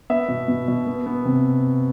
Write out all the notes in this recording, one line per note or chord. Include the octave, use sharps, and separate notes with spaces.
B3 E5
B2
B2
B2
B3
B3
C3